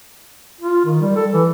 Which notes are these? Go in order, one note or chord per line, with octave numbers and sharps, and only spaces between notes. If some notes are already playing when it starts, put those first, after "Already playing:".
F4
D#3
G3
A4
E3